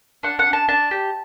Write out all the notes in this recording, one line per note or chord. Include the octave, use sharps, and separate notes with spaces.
D4 F#5
F#5
D4
A5
D4 A5
G4